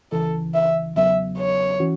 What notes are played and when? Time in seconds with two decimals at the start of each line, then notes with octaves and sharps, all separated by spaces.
0.12 C#2 C#3 E3 A4
0.54 E5
0.96 E2 C#3 F#3 B3 E5
1.38 C#5
1.80 E3 C#4 F#4